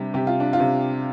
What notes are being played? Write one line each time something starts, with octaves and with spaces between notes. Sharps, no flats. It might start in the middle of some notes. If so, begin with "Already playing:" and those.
Already playing: C3 G3 D4 G4
C3 G4
F4
D4
F4
C3